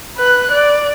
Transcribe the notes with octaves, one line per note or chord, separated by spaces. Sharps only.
B4 F#6
D5